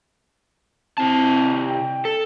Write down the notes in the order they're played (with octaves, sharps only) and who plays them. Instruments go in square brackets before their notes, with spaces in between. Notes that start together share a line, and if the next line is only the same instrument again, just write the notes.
[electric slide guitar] C3 E4 A5 [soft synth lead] C4
[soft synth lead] G5
[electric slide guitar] A4